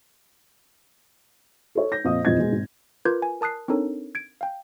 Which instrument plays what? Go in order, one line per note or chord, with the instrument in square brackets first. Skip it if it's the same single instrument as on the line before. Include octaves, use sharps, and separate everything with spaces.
[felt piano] A4 C#5
G6 A#6
F2 A#2 F4 D#5 F5 D#6
D#1 A#1 F2 E3 D#5 G#6
B2 G#3
G#1
[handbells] F4 A#4 B4 D6 G6 G#6
G#5
A#4 A5 D#6 F#6 C7
C4 D4 D#4 A4 A#4 C#5
G#6 D7
F5 G5